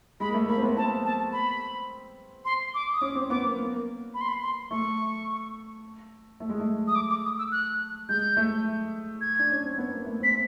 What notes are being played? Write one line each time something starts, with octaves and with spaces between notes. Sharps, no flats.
G#3 B5
A#3
A3
A#3 B5
C4
B3
C4 A5
A5
B5
C6
D6
D#6
C#4 D6
C4
B3 D6
A#3
A#3
B5
C6
B5
C6
A3 C#6
A3
G#3
A3
D#6
D6
D6
D#6
E6
F#6
G#3 G6
A3
G#6
D4
C#4
C4
B3
A#3
A3
C4 B6